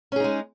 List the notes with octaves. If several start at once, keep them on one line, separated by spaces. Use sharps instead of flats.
G#3 C#4 D#4 G#4